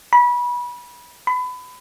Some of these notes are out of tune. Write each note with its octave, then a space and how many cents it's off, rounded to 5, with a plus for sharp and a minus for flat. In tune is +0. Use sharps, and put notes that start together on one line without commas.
B5 -25
B5 +25